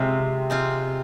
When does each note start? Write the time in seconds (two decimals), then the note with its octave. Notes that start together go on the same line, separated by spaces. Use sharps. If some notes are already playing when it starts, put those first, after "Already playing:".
Already playing: C3 G#3 C4 F4
0.50 G#3 C4 F4